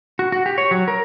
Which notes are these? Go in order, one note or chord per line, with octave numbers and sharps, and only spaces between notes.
F#4
F#4
G4
C#5
F#3
A#4